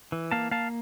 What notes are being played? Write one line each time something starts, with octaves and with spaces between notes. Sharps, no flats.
E3
A#3 F5 A5
A#3 F5 A5